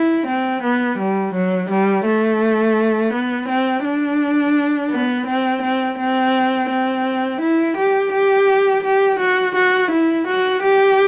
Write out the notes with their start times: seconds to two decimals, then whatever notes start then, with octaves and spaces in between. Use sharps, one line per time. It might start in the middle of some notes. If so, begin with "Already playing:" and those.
Already playing: E4
0.27 C4
0.63 B3
0.98 G3
1.34 F#3
1.70 G3
2.05 A3
3.13 B3
3.48 C4
3.84 D4
4.91 B3
5.27 C4
5.62 C4
5.98 C4
6.70 C4
7.41 E4
7.77 G4
8.13 G4
8.84 G4
9.20 F#4
9.55 F#4
9.91 E4
10.27 F#4
10.62 G4